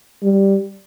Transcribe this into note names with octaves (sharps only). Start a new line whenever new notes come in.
G3